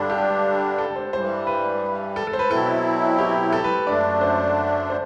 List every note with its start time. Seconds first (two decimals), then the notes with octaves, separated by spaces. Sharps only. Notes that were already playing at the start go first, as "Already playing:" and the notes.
Already playing: G2 D3 G3 D4 A4
0.10 G4
0.78 A4
0.96 C5
1.13 G2 E3 G3 C5
1.47 B4
2.16 A4
2.27 A4
2.33 C5
2.39 B4
2.50 B2 F#3 C4 E4 A4
3.19 G4
3.53 A4
3.64 B4
3.87 F#2 D3 A3 D4 D5
4.21 C5
4.90 C5